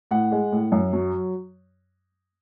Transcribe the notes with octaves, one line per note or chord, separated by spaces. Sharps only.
A2 F#5
G#3
A2
F#2
F#3